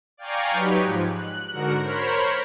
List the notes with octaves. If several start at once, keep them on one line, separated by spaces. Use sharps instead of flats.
D5 F5 G5 G#5 A#5 C#6
F#3 D#4 G4 B4 C#5
G#2 F3
F#6
G#2 D3 F#4 A#4 F#5
A#4 C5 C#5 B5